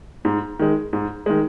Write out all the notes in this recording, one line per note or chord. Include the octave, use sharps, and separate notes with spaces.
G#2
D#3 G#3
G#2
D#3 G#3